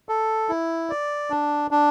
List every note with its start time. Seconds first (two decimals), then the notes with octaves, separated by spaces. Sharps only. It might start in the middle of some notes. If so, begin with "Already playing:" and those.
0.09 A4
0.49 E4
0.90 D5
1.30 D4
1.71 D4